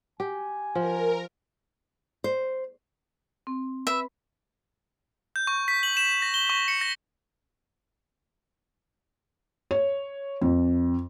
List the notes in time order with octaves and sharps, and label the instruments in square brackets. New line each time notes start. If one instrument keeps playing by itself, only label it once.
[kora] G4 [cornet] G#5
[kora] F3 [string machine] A#4
[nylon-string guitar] C5
[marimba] C4
[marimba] B4 B5 [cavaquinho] E5
[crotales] G6
C#6
B6
F#7
E7
A#6
G7
C#6
C#7
A#6
[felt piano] C#5
F2